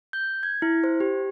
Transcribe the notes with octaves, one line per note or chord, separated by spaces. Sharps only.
G6
G#6
E4
C5
G4